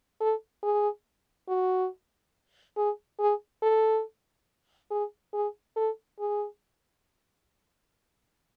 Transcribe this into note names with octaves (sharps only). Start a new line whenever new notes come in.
A4
G#4
F#4
G#4
G#4
A4
G#4
G#4
A4
G#4